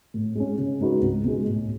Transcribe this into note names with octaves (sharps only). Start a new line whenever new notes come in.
A2
G#3 C#4
C#3
G#3 D#4 F#4 B4
C#2
B2 G#3
A2